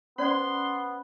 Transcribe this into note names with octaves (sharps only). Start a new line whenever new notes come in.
B3 C#4 C5 D5 C6